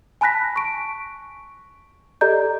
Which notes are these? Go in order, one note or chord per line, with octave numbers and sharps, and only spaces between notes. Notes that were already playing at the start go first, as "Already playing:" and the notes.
G#5 A5 B5 F#6 A#6 B6
C#6 D7
G4 A4 D5 D#5 A#5 G6